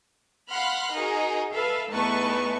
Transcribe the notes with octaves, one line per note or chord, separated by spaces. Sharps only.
F5 F#5 B5 C6 F6 F#6
D#4 F#4 G#4 A#4
A4 B4 E5 F5
E2 A3 D#4 B4 A5 C#6